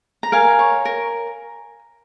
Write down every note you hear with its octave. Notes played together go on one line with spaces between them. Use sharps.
A#5
A#4 F5 G#5
C#5
A#4